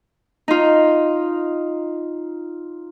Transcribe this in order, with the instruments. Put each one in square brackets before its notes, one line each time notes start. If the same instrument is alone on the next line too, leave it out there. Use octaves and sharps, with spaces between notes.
[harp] D#4 F4